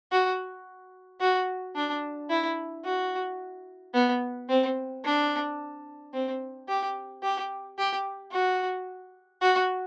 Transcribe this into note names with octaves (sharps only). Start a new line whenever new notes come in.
F#4
F#4
D4
E4
F#4
B3
C4
D4
C4
G4
G4
G4
F#4
F#4